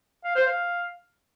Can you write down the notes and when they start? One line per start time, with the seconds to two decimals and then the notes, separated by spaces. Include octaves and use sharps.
0.24 F5
0.35 C5
0.47 F5